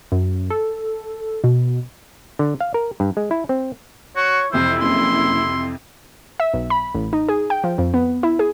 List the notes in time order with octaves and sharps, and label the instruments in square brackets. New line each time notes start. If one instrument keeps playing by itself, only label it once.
[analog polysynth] F#2
A4
B2
[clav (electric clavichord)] D3
F5
A#4
G2
G#3
E4
C4
[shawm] F#4 [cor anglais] C#5
[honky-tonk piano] F2 C3 E3 [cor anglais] E4 [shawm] C5
[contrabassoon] F#1 [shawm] C6
[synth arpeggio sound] E5
B1
B5
A1
D#4
G#4
G5
F3
F2
B3
E4
G#4